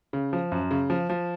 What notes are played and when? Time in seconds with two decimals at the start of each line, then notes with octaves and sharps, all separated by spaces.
0.13 C#3
0.33 F3
0.52 F#2
0.71 C#3
0.90 F3
1.10 F3